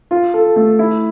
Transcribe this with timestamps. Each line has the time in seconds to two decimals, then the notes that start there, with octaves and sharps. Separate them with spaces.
0.11 F4
0.34 A4
0.56 A3
0.79 E4